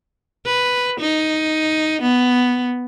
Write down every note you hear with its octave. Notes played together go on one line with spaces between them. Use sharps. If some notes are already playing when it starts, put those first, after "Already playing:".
B4
D#4
B3